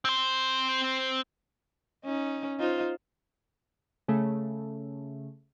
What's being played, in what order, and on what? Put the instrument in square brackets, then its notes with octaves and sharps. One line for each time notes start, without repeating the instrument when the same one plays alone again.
[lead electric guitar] C4 C5
[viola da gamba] C#4 D#4
D#4 F4 C5
[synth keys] C#3 A3